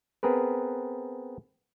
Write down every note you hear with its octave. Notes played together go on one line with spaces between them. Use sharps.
B3 C4 G#4 A#4 B4